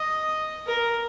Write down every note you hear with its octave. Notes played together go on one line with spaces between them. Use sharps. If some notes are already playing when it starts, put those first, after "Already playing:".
Already playing: D#5
A#4